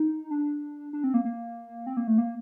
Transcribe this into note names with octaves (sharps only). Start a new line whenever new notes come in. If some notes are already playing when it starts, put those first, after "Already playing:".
Already playing: D#4
D4
D4
C4
A#3
A#3
C4
A#3
A3
A#3